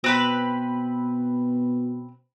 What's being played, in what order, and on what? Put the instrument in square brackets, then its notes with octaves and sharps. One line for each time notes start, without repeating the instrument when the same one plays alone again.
[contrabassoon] B2 [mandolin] C4 B4 B5